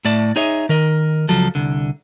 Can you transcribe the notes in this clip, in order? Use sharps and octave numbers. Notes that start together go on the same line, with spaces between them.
A2 A3 D5 A5
D#4 G#4 C#5 D#5 E5
D#3 A#4 D#5
C#2 F3 F#3 A4
C2 D3